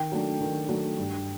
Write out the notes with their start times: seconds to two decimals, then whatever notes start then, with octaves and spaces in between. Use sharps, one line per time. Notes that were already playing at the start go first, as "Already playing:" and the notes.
Already playing: D#3 G5
0.12 F#3 A3 D4
0.41 D#3
0.69 F#3 A3 D4
0.98 G2